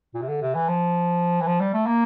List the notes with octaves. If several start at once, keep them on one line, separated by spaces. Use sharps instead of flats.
A#2
C3
D3
C3
E3
F3
E3
F3
G3
A3
A#3